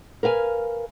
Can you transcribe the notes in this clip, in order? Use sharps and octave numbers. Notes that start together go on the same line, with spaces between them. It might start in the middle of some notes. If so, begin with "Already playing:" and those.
A#4 B4 F5 G#5